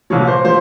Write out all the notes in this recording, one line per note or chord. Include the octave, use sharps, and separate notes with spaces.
C2 A#2 F3 C#5
C5
F3 C5